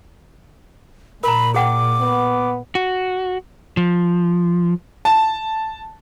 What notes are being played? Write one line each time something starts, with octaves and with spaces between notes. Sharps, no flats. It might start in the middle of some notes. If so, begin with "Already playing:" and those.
A#2 A#4 A#5 B5
G#4 F#5 G5 D6
B3
F#4
F3
A5